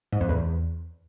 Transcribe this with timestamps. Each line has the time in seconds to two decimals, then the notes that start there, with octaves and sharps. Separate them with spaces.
0.13 G#2
0.21 F2
0.29 E2